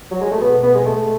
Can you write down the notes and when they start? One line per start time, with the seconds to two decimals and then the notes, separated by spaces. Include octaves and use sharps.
0.11 F#3
0.21 G#3
0.31 A3
0.41 B2 B3
0.56 B2
0.63 B3
0.75 G#3
0.84 B2 A3